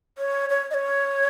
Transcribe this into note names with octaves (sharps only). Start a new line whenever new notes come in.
C#5
C#5
D#5
C#5